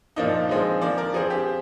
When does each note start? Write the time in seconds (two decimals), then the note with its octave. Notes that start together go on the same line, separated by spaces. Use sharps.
0.16 A#2 F3 A#3 D4 D#4
0.49 F3 G#3 C4
0.82 F3 A#3 D4 D5
0.98 A#4
1.14 F3 C4 G#4
1.30 G4